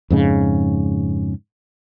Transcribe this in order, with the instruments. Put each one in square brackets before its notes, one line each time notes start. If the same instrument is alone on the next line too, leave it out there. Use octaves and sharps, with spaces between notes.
[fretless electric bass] F2 G#2 C#3